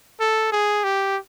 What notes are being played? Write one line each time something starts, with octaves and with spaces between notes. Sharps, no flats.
A4
G#4
G4